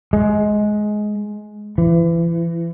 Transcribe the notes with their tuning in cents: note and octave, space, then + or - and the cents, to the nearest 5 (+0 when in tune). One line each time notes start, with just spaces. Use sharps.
G#3 +15
E3 +35